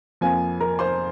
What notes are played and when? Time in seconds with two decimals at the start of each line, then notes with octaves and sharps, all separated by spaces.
0.21 F2 F3 A#3 G#5
0.60 A#4 A#5
0.79 C5 C6